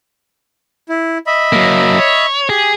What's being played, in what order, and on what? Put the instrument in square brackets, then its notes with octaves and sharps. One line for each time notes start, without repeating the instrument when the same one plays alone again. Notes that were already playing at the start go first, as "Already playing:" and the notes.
[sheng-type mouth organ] E4
D#5 E5 B5
[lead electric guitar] F#3 A#3
C#5
[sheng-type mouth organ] G4 [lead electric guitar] G#4